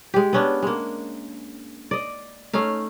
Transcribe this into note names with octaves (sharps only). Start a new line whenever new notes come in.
G#3 G4
B3 C#4 D4
G#3 A#3
D5 D#5
A3 C#4 D#4 F5